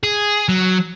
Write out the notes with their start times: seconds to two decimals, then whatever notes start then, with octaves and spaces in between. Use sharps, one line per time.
0.04 G#4
0.49 F#3